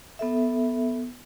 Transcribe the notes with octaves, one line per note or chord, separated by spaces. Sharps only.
B3 A4 E5